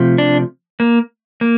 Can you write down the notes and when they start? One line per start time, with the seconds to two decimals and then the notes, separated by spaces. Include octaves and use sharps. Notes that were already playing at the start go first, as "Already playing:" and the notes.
Already playing: C3 F3 A3
0.18 D4
0.80 A#3
1.41 A#3